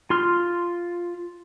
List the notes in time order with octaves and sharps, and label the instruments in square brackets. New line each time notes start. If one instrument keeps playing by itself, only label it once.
[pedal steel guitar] F4 C6 F6